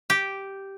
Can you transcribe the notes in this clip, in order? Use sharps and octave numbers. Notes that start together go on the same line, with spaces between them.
G4